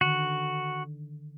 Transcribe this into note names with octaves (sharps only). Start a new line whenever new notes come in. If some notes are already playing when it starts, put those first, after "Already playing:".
D3 D#3 F#4